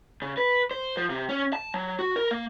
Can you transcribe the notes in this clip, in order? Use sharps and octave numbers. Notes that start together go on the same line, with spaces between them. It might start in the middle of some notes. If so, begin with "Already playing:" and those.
C#3
B4
C5
F3
C3
C#4
A5
F#3
F#4
A#4
A#3